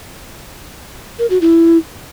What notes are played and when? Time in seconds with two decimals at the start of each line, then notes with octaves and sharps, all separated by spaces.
1.19 A#4
1.30 F#4
1.41 E4